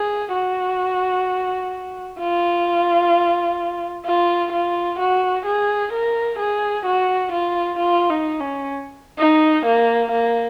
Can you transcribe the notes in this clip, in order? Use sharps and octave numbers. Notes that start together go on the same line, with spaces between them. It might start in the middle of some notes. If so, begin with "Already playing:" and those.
Already playing: G#4
F#4
F4
F4
F4
F#4
G#4
A#4
G#4
F#4
F4
F4
D#4
C#4
D#4
A#3
A#3